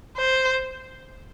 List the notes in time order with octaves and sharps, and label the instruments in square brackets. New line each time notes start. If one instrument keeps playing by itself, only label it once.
[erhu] C5